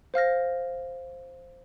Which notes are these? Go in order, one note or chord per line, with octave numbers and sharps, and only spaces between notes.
C5 F5 F6 A#6